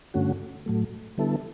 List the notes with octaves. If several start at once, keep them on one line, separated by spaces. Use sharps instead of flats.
G2 D3 A3 C#4 F#4
A2 F#3 A3
D3 G3 B3 E4 A4